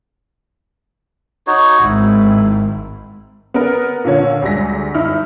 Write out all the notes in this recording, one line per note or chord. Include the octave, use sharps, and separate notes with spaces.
D#4 F#4 C#5
G#1 G#2 E4
B3 A#4
A#2 D3 C#5
D2 G3 G#3 D5 A#6 B6
G1 D#4 E4 F6